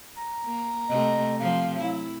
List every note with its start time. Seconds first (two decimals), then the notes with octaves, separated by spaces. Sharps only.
0.17 A#5
0.46 A#3
0.89 C3 A3 D#5
1.39 C3 F3 F5
1.79 F#3 E4